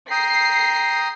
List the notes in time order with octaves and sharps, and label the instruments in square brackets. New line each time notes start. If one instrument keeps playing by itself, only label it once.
[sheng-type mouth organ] G5 A#5 D#6 [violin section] C7